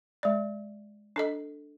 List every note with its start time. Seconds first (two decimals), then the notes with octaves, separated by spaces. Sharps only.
0.23 G#3 D5
1.16 D4 A4 D#5